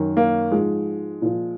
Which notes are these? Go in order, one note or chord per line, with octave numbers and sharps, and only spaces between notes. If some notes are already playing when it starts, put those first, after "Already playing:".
Already playing: F#2 D#3
A#3
G#2 F3 G#3
A#2 F3